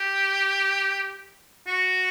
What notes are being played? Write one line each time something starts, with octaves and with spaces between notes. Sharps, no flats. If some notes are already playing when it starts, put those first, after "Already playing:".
Already playing: G4
F#4